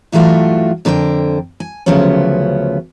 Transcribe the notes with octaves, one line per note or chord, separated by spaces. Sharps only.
G2 E3 F#3 A3 F4 F#4
F2 D3 A#4 B4 G5
G#5
D2 C#3 F3 F#3 B3 C#4